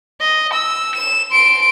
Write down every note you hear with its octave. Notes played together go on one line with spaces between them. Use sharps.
D#5
E6
E7
C6 D7